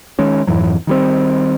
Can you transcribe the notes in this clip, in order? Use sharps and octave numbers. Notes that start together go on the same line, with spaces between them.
D#3 G#3 C#4
F2 G#2 E3 F#3
D#3 G3 C4